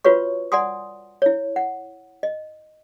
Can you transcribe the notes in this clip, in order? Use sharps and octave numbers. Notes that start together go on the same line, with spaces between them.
F4 F#4 B4 C#5 C#6
D5 F#5 G#5 C6 D#6
E4 C#5
F#5
D#5